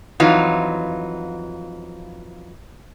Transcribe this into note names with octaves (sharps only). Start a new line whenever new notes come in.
F2 E3 F#3 D#4 F4